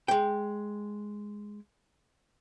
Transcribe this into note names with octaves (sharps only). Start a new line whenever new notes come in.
G#3 G5